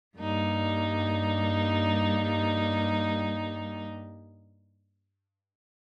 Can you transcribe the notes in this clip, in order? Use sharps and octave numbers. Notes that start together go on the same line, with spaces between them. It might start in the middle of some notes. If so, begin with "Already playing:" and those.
G2 G3 A#3 D#4